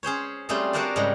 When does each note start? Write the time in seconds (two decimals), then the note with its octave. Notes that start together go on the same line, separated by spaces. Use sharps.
0.03 C#4 G#4 C5 C#5
0.49 G3 A3 C4 C#4 F4 G#4
0.73 D4 F4 F#4 A#4 C5 D5
0.96 G#2 C#3 G3